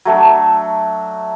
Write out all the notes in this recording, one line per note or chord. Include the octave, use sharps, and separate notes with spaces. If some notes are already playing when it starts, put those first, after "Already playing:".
F#3 A3 D4